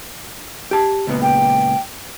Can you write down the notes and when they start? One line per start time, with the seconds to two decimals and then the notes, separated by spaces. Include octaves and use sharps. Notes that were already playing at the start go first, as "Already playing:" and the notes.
0.71 G4 A5
1.07 C#2 A#2 B3
1.22 G5